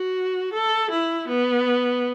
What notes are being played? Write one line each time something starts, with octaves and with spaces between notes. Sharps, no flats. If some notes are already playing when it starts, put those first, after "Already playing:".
Already playing: F#4
A4
E4
B3